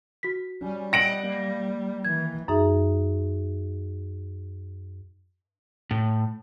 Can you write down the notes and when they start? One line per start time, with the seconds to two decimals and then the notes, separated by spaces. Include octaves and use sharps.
0.23 F#4 B6
0.61 G3 C#4
0.93 D#5 F#5 G5 A#6 D7 F#7
1.24 A#3
2.04 D#3 E3 G#6
2.48 F#2 D#4 G#4 E5
5.91 A2